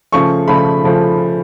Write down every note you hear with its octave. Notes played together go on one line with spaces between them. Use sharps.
C#3 F3 A3 C#6
C#3 F3 A3 B5
C#3 F3 A3